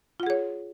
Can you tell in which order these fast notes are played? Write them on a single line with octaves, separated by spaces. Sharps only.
F4 F#5 G#4 C#5